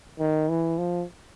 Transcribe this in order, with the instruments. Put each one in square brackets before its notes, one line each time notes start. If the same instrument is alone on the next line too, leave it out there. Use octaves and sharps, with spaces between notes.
[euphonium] D#3
E3
F3